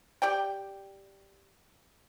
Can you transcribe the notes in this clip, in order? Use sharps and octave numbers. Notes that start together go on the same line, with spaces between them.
G4 D5 G5